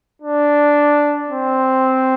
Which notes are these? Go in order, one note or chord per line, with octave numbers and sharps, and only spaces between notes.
D4
C4